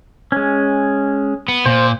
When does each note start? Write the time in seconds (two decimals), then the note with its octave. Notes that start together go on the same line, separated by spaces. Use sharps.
0.32 G#3 C#4
1.48 B3
1.66 A#2 C5